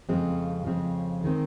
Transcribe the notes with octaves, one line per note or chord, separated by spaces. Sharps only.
F2 C#3 F3 G#3 C4
F2 C#3 F3 G#3 C4
D#3 G#3 C4